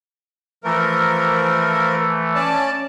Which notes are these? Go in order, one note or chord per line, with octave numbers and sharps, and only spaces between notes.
E3 F3 A3 A#4
C#4 D5 A5